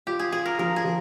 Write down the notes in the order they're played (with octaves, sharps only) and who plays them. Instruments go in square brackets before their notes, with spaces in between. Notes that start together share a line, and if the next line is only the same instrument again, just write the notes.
[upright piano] F4 [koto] G4
[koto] G#4
[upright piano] F4 [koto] G#4
[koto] A#4
[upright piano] F3 [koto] A#4
[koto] G#4
[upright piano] F3